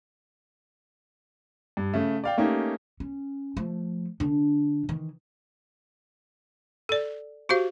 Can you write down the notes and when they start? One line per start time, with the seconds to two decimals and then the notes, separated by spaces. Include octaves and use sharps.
1.77 G2
1.93 C#3 A3
2.24 D5 F5 G5
2.37 A3 A#3 C#4 D#4 G4
3.00 C#4
3.57 F3 A3
4.20 D3 D4
4.89 D#3 E3
6.89 A4 D5
7.49 F#4 G4 C5 F5